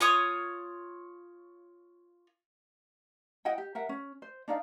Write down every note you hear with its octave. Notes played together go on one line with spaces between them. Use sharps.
F4 C#5 D#6
E4 D#5 F#5 G5
G4
A#4 E5 F#5
C#4
C5
D4 D#4 D5 F5